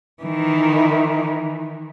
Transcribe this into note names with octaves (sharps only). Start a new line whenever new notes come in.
D#3 E3